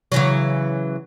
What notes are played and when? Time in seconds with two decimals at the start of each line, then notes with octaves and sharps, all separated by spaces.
0.12 C#3 E3 F#3